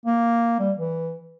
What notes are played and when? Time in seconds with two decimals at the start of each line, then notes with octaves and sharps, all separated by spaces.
0.06 A#3
0.59 G3
0.78 E3